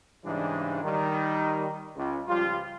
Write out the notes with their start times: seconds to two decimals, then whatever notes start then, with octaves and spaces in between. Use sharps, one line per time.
0.24 G#2 C#3 E3 G3 G#3 D4
0.83 D#3 G3
1.96 C#2
2.27 C#2 F3 G3 F4